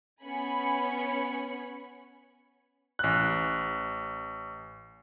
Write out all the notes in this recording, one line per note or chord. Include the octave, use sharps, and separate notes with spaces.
B3 C#4 G#5 B5 C#7
A1 F#6